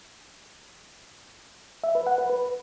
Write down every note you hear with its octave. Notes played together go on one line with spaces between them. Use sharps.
E5
B4
F#5
B4
B4